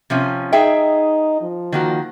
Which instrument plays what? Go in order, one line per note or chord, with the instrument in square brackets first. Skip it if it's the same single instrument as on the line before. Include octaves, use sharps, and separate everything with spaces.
[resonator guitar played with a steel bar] C3 F3 C#4
[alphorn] D#4 [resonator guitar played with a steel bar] G#4 E5 G5
[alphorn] F3
[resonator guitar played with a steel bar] D#3 A#3 F#4